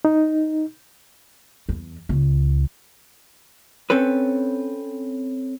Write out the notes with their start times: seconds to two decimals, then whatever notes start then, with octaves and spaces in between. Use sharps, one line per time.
0.05 D#4
1.69 E2
2.09 C#2
3.90 C4 C#4 A4 B4